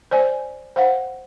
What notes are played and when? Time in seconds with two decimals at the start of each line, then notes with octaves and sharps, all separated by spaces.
0.11 C5 D5 G#5
0.76 C5 F5 F#5